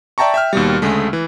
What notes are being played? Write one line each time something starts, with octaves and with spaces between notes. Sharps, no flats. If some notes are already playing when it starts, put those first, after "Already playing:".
D5 E5 G5 A5 A#5 C#6
E5 G5 F6
D#2 B2 G3
D2 C#3 G#3 A3
E3